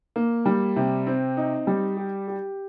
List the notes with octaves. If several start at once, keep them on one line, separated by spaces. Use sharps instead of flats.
A#3
G3
C3
C4
D#4
G3
G4
G4